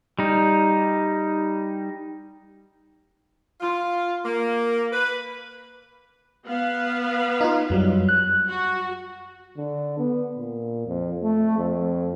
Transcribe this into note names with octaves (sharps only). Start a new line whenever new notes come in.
G3 D#4
F4
A#3
B4
B3 B4 F5
D#4 F4
F#2 F#3 G3
F#6
F#4
D3
B3
A#2
F2
A3
F2